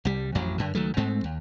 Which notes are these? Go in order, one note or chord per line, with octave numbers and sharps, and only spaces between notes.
C2 G3
A1 F2 F#3
F#2 D3
C#2 D#3 F#3 A3
G#2 G#3 A3 C4
D#2